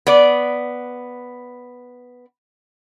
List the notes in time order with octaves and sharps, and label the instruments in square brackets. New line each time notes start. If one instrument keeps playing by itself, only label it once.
[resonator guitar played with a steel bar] B3 D5